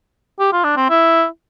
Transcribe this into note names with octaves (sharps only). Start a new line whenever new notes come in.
G4
F4
D4
C4
E4